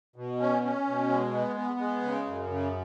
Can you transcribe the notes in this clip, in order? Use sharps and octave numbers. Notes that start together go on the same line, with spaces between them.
B2
C#4
C#4
B2
G#3
B3
B3
G#3
C#3
F#2
C#3